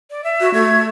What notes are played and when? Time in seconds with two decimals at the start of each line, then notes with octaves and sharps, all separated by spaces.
0.11 D5
0.24 E5
0.41 F#4
0.54 A3 G#6